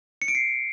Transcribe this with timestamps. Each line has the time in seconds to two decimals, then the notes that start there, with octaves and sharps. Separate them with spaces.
0.22 C#7
0.28 D7
0.35 C7